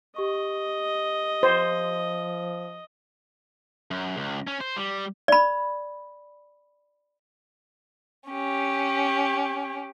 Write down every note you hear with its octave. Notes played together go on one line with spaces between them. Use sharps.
G4 D#5 C#6
F3 C5
F#2
C#2
C#4
C5
G3
D5 B5
C#4 G4